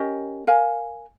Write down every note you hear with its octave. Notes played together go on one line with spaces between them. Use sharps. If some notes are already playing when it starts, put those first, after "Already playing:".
Already playing: C#4 G4 A#4 D#5
A#4 F5 G#5